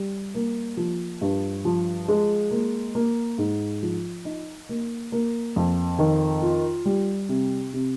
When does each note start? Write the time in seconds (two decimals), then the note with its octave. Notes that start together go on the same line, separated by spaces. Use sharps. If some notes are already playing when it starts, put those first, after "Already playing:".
Already playing: G3
0.35 A#3
0.77 F3
1.21 G2
1.65 F3
2.08 G#3
2.51 A#3
2.95 A#3
3.38 G#2
3.83 F3
4.25 D#4
4.69 A#3
5.12 A#3
5.56 F2
5.99 D#3
6.42 F4
6.85 G3
7.29 C3
7.74 C3